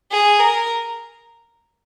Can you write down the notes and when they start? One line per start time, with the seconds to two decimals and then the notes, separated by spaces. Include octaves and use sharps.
0.11 G#4
0.39 A#4